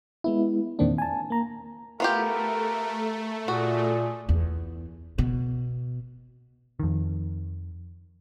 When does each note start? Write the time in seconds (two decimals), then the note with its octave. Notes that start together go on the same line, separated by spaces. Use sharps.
0.24 G#3 B3 E4
0.79 E2 A#2 D#3 A#3 C4 D4
0.98 G#5 A5
1.30 A#3 A#5
2.00 A3 B3 F4 G4 A#4
3.48 A#2 F#4 G#4
4.29 E2
5.18 B2
6.80 F2 D#3